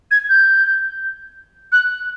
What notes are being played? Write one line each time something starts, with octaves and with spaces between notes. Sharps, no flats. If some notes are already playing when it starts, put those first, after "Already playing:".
G#6
G6
F#6